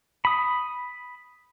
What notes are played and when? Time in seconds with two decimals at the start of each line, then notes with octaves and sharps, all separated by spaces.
0.25 B5 D#6